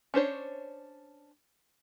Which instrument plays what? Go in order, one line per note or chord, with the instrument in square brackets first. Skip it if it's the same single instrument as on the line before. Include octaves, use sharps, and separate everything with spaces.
[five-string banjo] C#4 D4 C5 C#5